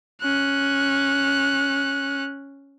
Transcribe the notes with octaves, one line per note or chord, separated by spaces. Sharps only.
C#4 F#6